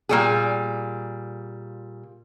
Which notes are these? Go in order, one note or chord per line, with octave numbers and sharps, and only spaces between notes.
A#2 G3 G#4